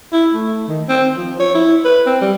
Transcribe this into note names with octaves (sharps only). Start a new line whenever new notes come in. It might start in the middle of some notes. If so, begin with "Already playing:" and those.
E4
A3
D#3
C4
F3
C#5
E4
B4
C4
G3